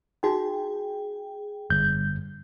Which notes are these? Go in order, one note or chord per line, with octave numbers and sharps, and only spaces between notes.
D#4 F#4 G#4 F5 G5
G1 G2 G6